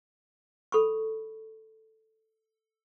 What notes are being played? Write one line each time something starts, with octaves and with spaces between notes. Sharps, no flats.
A4 B5 C#6